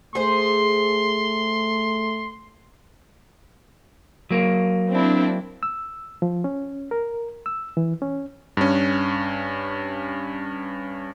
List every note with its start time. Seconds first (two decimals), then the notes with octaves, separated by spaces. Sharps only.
0.15 A3 G#4 C5 C6
4.31 F#3 A#3
4.92 C4 D4 E4
5.63 E6
6.22 F3
6.44 C#4
6.91 A#4
7.46 E6
7.77 E3
8.02 C#4
8.57 G2 C#4